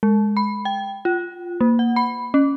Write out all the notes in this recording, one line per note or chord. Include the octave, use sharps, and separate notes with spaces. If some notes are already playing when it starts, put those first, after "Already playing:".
G#3
B5
G5
F4
A#3
F#5
B5
C#4